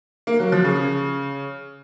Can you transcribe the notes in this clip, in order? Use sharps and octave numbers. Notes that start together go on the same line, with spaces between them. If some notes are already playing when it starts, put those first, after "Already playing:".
A#3
F#3
F3
C#3